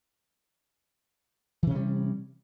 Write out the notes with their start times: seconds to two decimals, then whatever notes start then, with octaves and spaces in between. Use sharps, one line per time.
1.63 E3
1.67 C3
1.71 C#4
1.75 G3